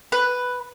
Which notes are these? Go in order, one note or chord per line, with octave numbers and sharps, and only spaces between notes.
B4